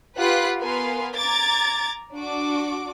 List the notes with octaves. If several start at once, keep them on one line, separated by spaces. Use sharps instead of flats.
F4 G4 B4 F#5 F#6
B3 A#4 B4 F5 G#5 C6
A#5 D6 G#6 A6
D4 F#4 D6